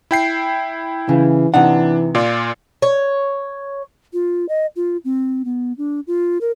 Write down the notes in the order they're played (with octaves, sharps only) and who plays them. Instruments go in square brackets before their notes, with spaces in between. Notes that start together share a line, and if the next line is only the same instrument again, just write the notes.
[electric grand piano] E4 G5 C7
[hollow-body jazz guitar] C#3 [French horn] E3
[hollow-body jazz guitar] C3 D#4 F#5 [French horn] E3 [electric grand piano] D4
[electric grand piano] A#2 F4 D5
[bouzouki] C#5
[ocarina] F4
D#5
F4
C4
B3
D4
F4
A#4